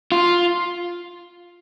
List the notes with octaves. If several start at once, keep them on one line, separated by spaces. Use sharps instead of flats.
F4